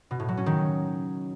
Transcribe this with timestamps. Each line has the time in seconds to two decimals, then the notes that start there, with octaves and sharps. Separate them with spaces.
0.11 B2
0.20 A2
0.28 F#3
0.37 C#4
0.46 D#3